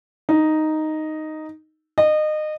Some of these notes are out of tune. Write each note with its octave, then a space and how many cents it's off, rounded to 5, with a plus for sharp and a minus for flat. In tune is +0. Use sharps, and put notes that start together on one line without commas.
D#4 +0
D#5 -25